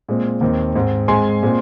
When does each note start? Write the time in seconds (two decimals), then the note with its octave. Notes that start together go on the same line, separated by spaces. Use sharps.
0.08 A#2 G#3 C4
0.41 D#2 D#3 C4
0.75 G#2 G#3 C4
1.08 G#2 G#3 C4 G#5 C6
1.43 A#2 G#3 C4